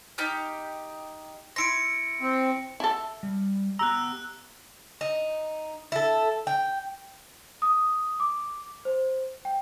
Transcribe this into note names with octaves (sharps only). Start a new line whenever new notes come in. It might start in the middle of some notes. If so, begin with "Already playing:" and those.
D#4 G4 F6
E4 C6 A#6 C#7 D7
C4
E4 A4
G3
B3 G4 A#5 E6 F#6
D#4
E4 A4
G5
D#6
D6
C5
G5